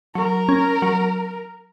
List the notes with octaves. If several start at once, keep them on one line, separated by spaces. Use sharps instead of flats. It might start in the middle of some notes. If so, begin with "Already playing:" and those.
F#3 A#4
C#4
F#3